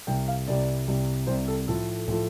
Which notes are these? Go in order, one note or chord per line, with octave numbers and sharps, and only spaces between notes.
C2 C3 G3 G5
F5
C2 C3 G3 D5
C2 C3 G3
C2 C3 G3 C5
A4
A2 F3 A3 A4
A2 F3 A3